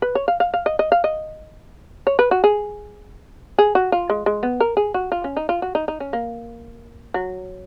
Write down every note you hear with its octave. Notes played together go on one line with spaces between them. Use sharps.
B4
C#5
F5
F5
F5
D#5
D#5
F5
D#5
C#5
B4
F#4
G#4
G#4
F#4
F4
G#3
G#3
B3
A#4
G#4
F#4
F4
C#4
D#4
F4
F#4
D#4
D#4
C#4
A#3
F#3